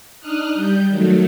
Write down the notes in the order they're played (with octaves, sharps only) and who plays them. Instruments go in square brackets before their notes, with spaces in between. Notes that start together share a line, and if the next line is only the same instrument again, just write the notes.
[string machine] D4 D#4 D#6 F6 F#6
G3 G6
D#3 F#3 A3